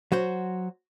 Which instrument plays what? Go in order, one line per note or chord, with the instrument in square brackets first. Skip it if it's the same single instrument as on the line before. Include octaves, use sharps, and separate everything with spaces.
[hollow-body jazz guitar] F#3 F#4 C5